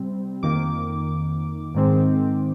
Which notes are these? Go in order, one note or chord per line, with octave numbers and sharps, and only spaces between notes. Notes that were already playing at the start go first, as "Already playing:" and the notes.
Already playing: C3 G3 C4
F2 D#3 A#3 D6
G#2 D#3 G#3 C4